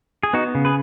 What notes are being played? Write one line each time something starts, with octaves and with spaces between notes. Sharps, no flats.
G#4
B3 D#4 F#4
C#3
G#4 B4